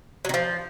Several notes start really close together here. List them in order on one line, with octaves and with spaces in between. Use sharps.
F#3 D#3 F3